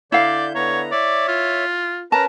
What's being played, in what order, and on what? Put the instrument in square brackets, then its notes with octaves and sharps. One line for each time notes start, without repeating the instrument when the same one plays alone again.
[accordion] D3 G6 [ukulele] E4 F5 [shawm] D5
[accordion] D3 B3 A#5 [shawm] C#5
[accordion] C#5 E5 [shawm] D5
[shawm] F4
[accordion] C#4 A#4 B4 [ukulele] A5 [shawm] A#5